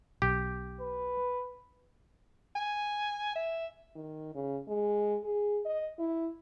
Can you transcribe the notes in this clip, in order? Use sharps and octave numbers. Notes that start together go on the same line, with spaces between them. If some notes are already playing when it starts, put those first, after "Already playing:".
B1 G4
B4
G#5
E5
D#3
C#3
G#3
G#4
D#5
E4